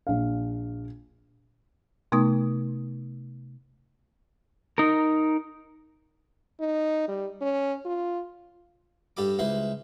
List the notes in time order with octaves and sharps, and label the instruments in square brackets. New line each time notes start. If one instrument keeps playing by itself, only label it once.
[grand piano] A#1 F5
[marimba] C3 A3 B3 D#4 D#6
[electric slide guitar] D#4 A#4
[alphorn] D#4
G3
C#4
F4
[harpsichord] G2 G4 A4 B5 D6
C#2 E4 B4 C5 C6